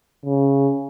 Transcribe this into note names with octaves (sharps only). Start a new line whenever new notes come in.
C#3